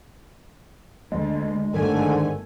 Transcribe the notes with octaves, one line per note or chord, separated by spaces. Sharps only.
D2 G#3
G1 G#2 D3 D#3 A3 G#5